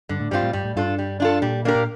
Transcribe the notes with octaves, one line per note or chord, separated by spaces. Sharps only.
G2 D3
A2
G2 G3 C4 F4
A2
G2 G3
A2
G2 D4 F4 A4
G3
D4 F4 A4
A#2 G3
A#3 D4 G4 A#4
A#2